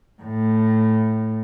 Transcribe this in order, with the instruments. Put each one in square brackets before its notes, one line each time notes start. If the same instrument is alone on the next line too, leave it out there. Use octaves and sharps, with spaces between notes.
[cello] A2